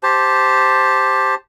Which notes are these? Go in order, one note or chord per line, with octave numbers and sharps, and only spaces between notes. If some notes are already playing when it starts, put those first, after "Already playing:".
G4 C5 A5